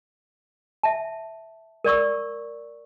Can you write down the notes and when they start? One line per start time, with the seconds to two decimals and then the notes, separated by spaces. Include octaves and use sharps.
0.83 E5 A5
1.85 A#4 D5 C#6 E6